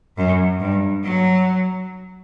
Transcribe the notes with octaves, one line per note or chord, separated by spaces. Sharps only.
F#2
G2
F#3